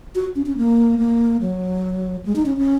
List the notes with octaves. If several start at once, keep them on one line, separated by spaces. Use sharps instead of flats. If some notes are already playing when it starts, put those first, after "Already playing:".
F#4
C#4
C#4
A#3
A#3
F#3
G#3
D#4
C#4
C#4